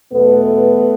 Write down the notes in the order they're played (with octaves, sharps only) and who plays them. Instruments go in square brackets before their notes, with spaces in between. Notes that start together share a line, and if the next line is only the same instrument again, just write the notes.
[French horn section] E2 B2 A3 B3